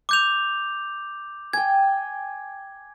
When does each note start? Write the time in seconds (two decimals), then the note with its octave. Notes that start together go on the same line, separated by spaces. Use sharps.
0.09 D6 G6 F7
1.53 G5 G#5 G#6